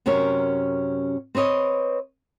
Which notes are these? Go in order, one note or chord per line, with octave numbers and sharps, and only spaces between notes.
F#2 C3 C#4 A#4 C#5
C4 B4 C#5 D#5